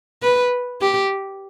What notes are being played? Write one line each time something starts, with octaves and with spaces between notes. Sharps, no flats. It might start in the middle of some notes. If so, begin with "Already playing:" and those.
B4
G4